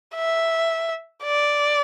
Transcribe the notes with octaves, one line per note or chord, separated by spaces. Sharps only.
E5
D5